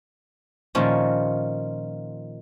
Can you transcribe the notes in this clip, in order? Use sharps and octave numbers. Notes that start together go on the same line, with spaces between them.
A#2 D#3 F3 C#4